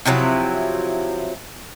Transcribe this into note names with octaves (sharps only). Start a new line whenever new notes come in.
C3 F3 F#3 E4